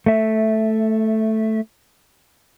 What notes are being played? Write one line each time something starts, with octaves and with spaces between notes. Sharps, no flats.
A3 E5